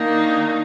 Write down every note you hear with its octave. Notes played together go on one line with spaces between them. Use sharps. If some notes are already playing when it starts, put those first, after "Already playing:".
Already playing: D#3 A#3 D4 D#4